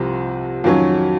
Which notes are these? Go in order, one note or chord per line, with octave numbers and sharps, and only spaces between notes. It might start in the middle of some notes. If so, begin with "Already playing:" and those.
Already playing: C2 C3 F3 C4
F2 D#3 F#3 C#4